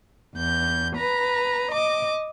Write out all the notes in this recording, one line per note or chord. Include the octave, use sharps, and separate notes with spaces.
E2 G6
B4 A#5
D#5 D6